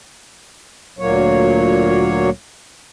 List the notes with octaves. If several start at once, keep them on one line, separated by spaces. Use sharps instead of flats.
D2 A#2 F#3 A#3 C#5